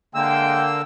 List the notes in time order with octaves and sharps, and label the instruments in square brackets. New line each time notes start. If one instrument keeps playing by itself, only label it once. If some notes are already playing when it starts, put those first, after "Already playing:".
[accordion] D3 A#3 E6 [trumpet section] G#3 G5